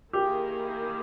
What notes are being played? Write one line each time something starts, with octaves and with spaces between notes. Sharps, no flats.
D#3 A#3 E4 G4 G#4